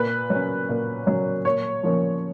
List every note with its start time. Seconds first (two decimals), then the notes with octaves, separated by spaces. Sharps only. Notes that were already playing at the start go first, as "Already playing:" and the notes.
Already playing: A#2 B4
0.30 F#3 C#4
0.69 A#2
1.07 F#3 C#4
1.45 A#2 C#5
1.83 F3 A#3 C#4